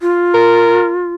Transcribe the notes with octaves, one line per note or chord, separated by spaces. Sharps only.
F4
A#4